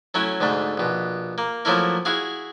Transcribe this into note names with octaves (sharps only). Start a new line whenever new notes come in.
F#3 A3 C#4 E4
D2 G#2 D3 A3
A#1 B2
A#3
F3 F#3 A3 A#3 E4 A#4
E4 F#4 G#4 F5